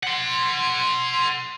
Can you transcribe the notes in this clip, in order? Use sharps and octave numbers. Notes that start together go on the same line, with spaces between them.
F#5 C6